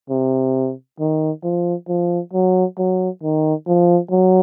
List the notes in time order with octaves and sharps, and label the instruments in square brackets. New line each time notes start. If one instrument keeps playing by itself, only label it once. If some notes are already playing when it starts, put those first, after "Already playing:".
[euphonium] C3
D#3
F3
F3
F#3
F#3
D#3
F3
F#3